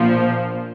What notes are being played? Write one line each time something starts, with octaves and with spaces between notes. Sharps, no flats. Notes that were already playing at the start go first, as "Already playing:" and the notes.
Already playing: A#1 A#2 F3